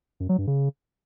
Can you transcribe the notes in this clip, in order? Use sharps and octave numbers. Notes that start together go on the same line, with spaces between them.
F#2
F#3
G2
C#3